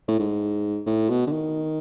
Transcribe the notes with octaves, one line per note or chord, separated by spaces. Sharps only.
A2
G#2
A2
B2
D3
D#3